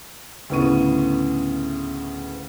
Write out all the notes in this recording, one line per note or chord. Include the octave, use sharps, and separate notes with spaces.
D2 A2 C#3 B3 C#6 D#7